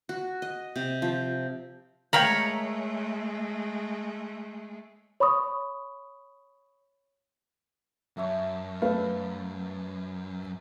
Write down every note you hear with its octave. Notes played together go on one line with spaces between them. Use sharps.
F#4
D#5
C3
F3
G#3 A3 A#4 C#5 F5 G5 A#5 B5
C#5 B5 C#6 D#6
F#2 C#5 E5 A5
A3 B4 F5